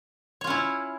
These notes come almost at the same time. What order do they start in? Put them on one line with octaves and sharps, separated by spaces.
C#5 F4 C#4 E4